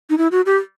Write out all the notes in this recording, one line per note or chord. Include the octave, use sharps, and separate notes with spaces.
D#4
E4
F#4
G4